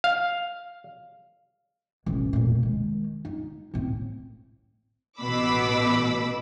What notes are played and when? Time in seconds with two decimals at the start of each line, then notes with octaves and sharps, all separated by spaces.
0.04 F5
2.06 E1 A1
2.33 F1 A#2
2.63 D#3 G#3
3.25 D#4
3.74 A2 C4
5.20 A1 B2 B5 D6 E6